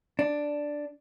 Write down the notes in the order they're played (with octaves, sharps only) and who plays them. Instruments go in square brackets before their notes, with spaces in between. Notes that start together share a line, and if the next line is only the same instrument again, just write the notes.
[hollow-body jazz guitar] D4